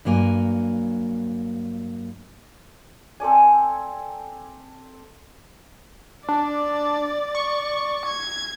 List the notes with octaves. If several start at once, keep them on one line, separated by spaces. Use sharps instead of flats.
G2 F#3 A#3 G#5
C4 A4 D5 G#5
D4 D5
C#6
G#6